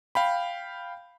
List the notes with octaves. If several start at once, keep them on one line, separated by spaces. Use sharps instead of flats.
F5 G5 B5